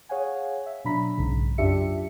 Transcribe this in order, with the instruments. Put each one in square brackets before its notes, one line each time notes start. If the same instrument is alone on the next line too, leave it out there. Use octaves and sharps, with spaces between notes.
[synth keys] G#4 C#5 F5 F#5 G#5
E5
B2 F#3 D4 A#5 B5 B6
B1 G#2 C#3
F#2 D4 F4 G4 E5 C#7